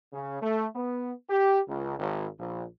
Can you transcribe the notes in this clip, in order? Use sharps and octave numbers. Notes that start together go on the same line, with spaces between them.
C#3
A3
B3
G4
C#2
G#1
A#1